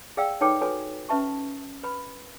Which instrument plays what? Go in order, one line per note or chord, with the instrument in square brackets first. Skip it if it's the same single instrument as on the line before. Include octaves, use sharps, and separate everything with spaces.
[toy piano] G#4 D5 F5 G5 E6
D#4 A4 B4 C#5 G5 D6
F#4 A4 B4 C#5 G#5
C#4 B4 E5 A5 C#6
B4 B5